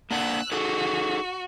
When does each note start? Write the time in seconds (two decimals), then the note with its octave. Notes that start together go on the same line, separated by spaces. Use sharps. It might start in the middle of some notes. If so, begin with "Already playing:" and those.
0.11 A#3 D4 F#5 E6 F#6
0.52 D#4 F#4 G#4 A4